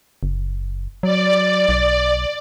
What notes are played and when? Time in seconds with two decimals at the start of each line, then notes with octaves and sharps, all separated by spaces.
0.23 F#1
1.03 F#3 D5
1.69 B1